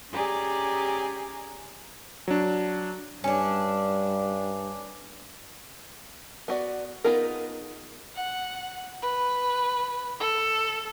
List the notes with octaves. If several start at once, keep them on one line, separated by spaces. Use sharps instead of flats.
C#4 G4 G#4 D5 G#5 A#5
F#3 D4
G2 C#4 D4
B3 F#4 D5
B3 D#4 F4 G#4 A#4
F#5
B4
A4